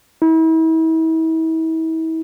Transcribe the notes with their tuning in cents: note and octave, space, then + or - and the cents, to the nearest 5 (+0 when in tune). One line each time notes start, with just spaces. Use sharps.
E4 -40